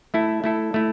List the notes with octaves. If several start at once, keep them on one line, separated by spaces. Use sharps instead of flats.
A3 E4 A4
A3 E4 A4
A3 E4